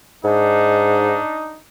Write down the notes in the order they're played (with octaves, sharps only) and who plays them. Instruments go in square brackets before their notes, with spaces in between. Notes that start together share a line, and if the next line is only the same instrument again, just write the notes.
[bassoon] G#2 [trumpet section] D4 D#4